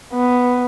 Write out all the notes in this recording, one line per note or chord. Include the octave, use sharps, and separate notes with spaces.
B3